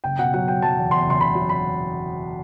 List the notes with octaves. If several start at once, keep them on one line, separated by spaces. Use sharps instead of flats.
F#1 G5
B2 F#5
F#3 F#5
F#3 G5
F#3 A5
E2
E2 C6
F#1 C6
F#1 B5
F#3
B5